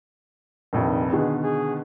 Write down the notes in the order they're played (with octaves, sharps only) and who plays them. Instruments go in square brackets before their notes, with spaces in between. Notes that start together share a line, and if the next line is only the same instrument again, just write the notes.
[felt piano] F1 A#1 F2 [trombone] D#3
[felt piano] B2 D3 D#3 [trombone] G#4
[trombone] G#4